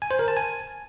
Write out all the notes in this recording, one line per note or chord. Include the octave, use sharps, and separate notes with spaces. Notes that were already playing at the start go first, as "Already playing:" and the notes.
G#5
C5
A#4
A5
G#5